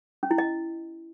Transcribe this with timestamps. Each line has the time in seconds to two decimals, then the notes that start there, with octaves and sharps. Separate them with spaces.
0.23 C#4
0.31 E4
0.38 D#5